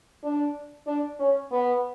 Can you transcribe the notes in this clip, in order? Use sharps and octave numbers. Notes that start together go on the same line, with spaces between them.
D4
D4
C#4
B3